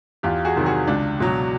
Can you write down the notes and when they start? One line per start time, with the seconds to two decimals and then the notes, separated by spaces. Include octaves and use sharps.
0.23 E2 F4 G4
0.45 F#4 G#4
0.56 C3 D#3 F#3
0.66 F#4 G#4
0.87 C#2 D4
1.20 B2 F#3